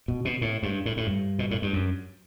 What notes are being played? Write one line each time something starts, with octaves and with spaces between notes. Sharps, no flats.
B2
B2
A2
G2
A2
A2
G2
B2
A2
G2
F#2